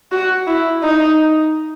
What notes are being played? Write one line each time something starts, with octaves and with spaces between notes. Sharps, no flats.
F#4
E4
D#4